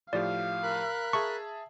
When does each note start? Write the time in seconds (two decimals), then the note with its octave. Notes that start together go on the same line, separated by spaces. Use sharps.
0.13 A2 F3 G4 D5 F5
0.63 A#4 B5 F#6
1.13 G#4 E5 A5 C#6